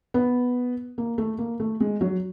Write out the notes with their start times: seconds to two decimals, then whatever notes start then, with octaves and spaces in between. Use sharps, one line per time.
0.14 B3
0.98 A#3
1.18 A3
1.39 A#3
1.60 A3
1.80 G#3
2.01 F#3